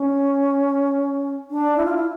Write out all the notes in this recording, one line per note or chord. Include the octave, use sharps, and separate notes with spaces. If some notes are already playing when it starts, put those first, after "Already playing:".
Already playing: C#4
D4
E4
F4
E4